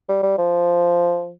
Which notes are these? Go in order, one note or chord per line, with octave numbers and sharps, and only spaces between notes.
G3
G3
F3